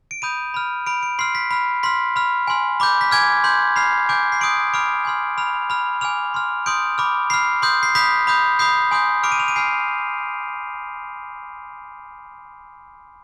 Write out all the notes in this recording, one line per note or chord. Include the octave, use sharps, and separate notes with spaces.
D7
B5 D#6 G6 D#7
B5 F6
B5 F6 D7
D7
C6 F6 C7
B6
B5 F6
C6 F6 B6
B5 F6
G#5 C6 F6
B5 D6 G6
B6
G#5 D6 F6 G#6
C6 G6
B5 F6 C7
G#5 D6 G6
C7
C6 D#6 G6 D7
B5 D6 F6 D7
G#5 C6 F6
B5 F6 F7
B5 F6
G#5 D6 F6 F7
C6 F6
C6 D#6 G6 D7
B5 D6 F6
B5 F6 C7
C6 D#6 G6
C7
B5 D#6 G6 B6
B5 D#6 G6
B5 D#6 G6 C7
G#5 C6 D#6 G6
B5 D6 F6 D7
D#7
F7
D#7
G#5 B5 F6 C7